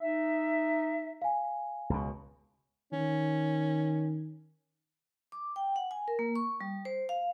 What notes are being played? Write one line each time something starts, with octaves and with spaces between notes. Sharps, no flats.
D#4 E5
F5 G#5
C#2 B2
D#3 C#4
D6
G5
F#5
G#5
A#4
A#3
C#6
G3
C5
F5